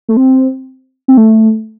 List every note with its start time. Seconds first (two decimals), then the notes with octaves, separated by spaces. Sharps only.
0.09 A3
0.17 C4
1.08 C4
1.17 A3